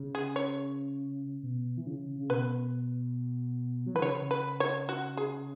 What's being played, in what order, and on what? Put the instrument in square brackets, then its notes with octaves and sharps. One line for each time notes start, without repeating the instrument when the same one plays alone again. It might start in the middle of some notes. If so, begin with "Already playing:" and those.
Already playing: [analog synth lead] C#3
[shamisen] G#4
C#5
[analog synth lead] B2
E3
C#3
C#3
[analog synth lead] B2 [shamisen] B4
[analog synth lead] F#3
[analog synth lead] E3 [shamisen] B4
[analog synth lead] C#3 [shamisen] C#5
[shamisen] B4
C#5
F#4
G#4